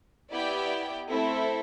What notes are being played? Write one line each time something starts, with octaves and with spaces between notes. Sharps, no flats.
B3 E4 G4 D5 G5
A3 C4 E4 A4 C5